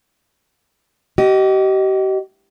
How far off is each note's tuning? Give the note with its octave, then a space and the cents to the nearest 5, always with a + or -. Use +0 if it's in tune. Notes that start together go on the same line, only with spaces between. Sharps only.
G4 -40 D#5 +0